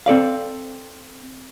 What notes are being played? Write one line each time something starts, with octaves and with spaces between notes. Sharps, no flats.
C4 A4 D5 F5